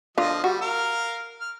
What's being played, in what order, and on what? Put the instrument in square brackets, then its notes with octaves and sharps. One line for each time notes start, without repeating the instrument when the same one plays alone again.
[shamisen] D3 F4 [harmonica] F3 D#5
[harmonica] G3 [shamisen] F#4
[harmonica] A#4 F5 F6
F6